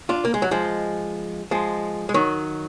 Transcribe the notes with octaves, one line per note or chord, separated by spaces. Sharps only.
D4 F4
A#3
G#3
F#3
F3 G#3
F3 G#3
G#3
D#3 F#3